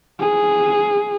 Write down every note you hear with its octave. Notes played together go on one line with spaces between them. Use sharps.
G#4